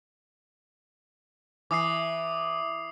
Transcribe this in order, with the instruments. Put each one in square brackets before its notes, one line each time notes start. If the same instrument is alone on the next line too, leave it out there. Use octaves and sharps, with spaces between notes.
[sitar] E3 [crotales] D6 D#6 C7